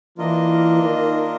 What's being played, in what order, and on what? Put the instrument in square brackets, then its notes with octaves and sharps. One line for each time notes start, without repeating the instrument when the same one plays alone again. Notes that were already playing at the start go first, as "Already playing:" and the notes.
[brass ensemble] E3 [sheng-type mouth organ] A#3 D4 F4 A#4 D#5
[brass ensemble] D#3